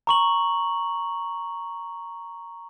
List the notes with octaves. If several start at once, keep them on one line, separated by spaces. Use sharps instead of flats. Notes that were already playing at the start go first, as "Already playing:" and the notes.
A#5 C#6 F#7